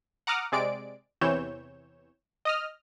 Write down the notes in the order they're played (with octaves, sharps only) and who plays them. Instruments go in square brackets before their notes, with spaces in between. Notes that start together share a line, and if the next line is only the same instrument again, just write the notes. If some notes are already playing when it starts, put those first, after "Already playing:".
[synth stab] F#5 A#5 D6 D#6 F6
C3 G#3 D5 D7
E2 C3 E3 C#5 G6 E7
D#5 D#6 F6